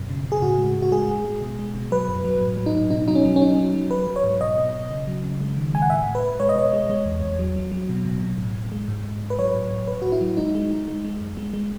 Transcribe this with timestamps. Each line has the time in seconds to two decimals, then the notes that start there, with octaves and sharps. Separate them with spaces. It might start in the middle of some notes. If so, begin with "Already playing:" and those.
Already playing: F#2 B2
0.10 C#3
0.25 C#3
0.32 G#4
0.42 A2 F#4
0.58 G#3
0.76 A2
0.82 F#4
0.92 G#3 G#4
1.08 G#3
1.25 G#3
1.42 B2
1.59 G#3
1.75 B2
1.91 F#3 B4
2.08 F#2
2.25 F#3
2.41 A2
2.57 F#3
2.66 D#4
2.74 A2
2.90 B2 D#4
3.08 F#3 D#4
3.15 C#4
3.25 F#3
3.36 C#4
3.41 F#3 D#4
3.58 F#3
3.74 F#3
3.90 F#3 B4
4.07 F#3
4.16 C#5
4.24 G#2
4.40 B2 D#5
4.57 B2
4.74 B2
4.91 C#3
5.07 F#3
5.24 C#3
5.40 G#3
5.57 D#3
5.74 G#3 G#5
5.82 F#5
5.90 A2 E5
6.07 A2
6.15 B4
6.23 A2
6.40 G#3 C#5
6.49 D#5
6.56 B2 C#5
6.73 G#3
6.89 G#3
7.05 E2
7.22 E2
7.39 F#3
7.56 F#3
7.72 F#3
7.89 B2
8.05 B2
8.22 B2
8.38 A2
8.55 A2
8.72 G#3
8.88 G#2
9.04 G#2
9.21 G#2
9.30 B4
9.39 F#3 C#5
9.55 A2
9.71 A2
9.88 A2 B4
10.02 A2 F#4
10.12 E4
10.21 F#3
10.37 G#3 D#4
10.55 G#3
10.71 G#3
10.88 G#3
11.05 G#3
11.21 F#2
11.37 G#3
11.54 G#3